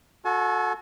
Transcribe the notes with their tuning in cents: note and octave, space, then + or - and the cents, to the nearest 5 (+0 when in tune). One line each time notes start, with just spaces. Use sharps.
F#4 -25 A4 +0 G#5 +45